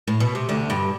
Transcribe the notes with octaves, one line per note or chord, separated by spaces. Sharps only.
A2
B2
C3
D2 D3
G2 G3